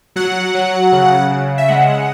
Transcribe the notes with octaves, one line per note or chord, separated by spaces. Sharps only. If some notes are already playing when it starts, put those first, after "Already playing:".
F#3 F#5
F#3
C#3
C#3
E5
G#3 F#5